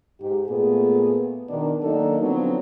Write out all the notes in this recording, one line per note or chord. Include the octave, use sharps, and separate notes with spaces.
G#2 G4
A#2 A3 B3 G#4
B2 D#3 D4
D#3 F#3 A#3 D4 D#4 A4
D3 F3 F#3 B3 C4 D4